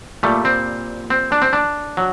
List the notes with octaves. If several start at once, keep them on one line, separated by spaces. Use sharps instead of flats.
A#2 G3 A3
C4
C4
D4
C4
D4
F#3